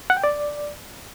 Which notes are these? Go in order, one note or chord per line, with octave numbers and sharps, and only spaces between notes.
F#5
G5
D5